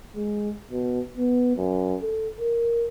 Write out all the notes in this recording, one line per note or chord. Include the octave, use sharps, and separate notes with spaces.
G#3
B2
B3
F#2
A4
A#4